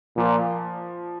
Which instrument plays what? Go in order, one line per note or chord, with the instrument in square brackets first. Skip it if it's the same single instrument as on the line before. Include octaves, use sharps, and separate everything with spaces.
[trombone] A#2 [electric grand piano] F3